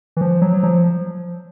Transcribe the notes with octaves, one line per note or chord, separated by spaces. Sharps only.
E3
F3
F#3
F#3
F3